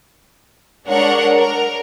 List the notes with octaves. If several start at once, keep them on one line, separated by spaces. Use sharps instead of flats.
G#3 D4 A#4 C#5 F#5
A#4